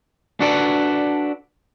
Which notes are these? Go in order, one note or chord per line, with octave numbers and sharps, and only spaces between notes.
D4 F#4 A4 B4 D5